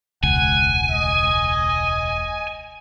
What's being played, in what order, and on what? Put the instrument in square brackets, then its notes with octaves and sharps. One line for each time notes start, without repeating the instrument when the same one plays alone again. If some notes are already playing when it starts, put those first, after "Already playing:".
[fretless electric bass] E1 C#2 [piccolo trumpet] F#5 [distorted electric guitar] G#5
[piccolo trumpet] D#5